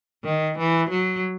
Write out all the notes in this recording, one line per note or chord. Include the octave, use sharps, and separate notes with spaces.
D#3
E3
F#3